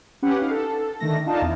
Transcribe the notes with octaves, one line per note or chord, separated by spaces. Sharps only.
C#4 G4 B4 F#5
D#4 F5
A4
D3 D#3 A3 A#6
D4 D#4 F4 F5 A5
E2 E4